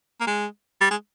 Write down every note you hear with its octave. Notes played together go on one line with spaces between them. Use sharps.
A#3
G#3
G3
G#3